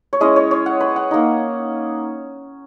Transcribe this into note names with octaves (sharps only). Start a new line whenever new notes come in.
C#5
G#3 C#4 E4 D#5
C#5
C#5
F#5
B4
F#5
A#3 D#4